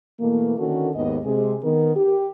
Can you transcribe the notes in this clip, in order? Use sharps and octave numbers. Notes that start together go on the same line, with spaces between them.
B2 E3 A3 A#3
D3 D#3 C#4 F#4 A4 A#4
D#2 G#2 D#3 B3 D#5
C3 G#3 G#4
D#3 B3 A#4
G4